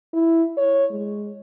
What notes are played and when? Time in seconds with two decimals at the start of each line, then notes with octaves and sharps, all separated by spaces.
0.14 E4
0.57 C#5
0.91 G#3